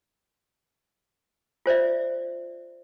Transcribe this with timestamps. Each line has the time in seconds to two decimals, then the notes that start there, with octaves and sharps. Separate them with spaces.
1.66 F4 C5 D5 E5